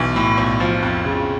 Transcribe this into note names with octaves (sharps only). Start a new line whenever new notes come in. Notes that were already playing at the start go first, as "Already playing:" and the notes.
Already playing: B1 E3
A2
B1
F3
F2
C#3